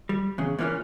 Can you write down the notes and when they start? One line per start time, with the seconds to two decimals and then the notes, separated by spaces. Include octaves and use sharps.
0.09 G3
0.38 E2 C#3
0.59 A#2 E3 A#3 C4 C#4